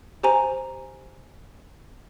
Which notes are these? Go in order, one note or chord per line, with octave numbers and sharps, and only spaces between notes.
G4 C5 G#5 A#5